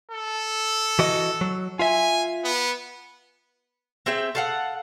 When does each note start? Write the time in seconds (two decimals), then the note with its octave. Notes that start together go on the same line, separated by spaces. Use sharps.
0.11 A4
0.99 E3 F#4 D#5
1.41 F#3
1.79 F4 E5 G#5
2.44 B3
4.06 C4 G#4 E5 G5
4.35 A4 F5 F#5